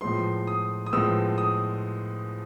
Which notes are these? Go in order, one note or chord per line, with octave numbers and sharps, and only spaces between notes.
A2 F3 G#3 B3 C6
D#6
D#6
A2 F3 G#3 B3 E6
D#6